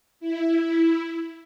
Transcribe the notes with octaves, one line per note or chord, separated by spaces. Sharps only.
E4